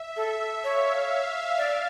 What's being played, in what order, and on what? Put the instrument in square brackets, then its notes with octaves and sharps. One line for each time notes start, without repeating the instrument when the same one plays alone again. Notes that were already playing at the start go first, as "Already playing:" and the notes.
Already playing: [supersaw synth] E5
[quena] A4
[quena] C#5 [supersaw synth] F5
[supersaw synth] F5
[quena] D5 [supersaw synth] F5